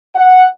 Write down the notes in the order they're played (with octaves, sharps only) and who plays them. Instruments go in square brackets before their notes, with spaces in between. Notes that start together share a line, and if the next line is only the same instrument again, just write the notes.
[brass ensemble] F#5